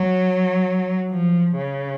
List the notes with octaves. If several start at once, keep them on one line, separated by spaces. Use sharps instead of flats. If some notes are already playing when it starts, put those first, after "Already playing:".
Already playing: F#3
F3
C#3